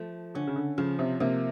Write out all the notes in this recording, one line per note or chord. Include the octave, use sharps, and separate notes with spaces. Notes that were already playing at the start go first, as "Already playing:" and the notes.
Already playing: F3 A3
D3 C#4
C#3
D3
C#3 F3
C3
C3 A#3